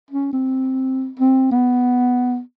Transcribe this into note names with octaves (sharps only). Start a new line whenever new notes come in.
C#4
C4
C4
B3